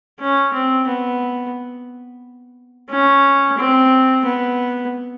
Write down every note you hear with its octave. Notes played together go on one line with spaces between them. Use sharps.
C#4
C4
B3
C#4
C4
B3